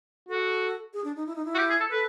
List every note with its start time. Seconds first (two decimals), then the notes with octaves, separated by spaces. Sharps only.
0.29 F#4 A4
0.93 G#4
1.04 D4
1.16 D#4
1.26 E4
1.35 D#4
1.45 E4
1.55 F#4
1.58 G4
1.70 G#4
1.80 A4
1.91 A4 B4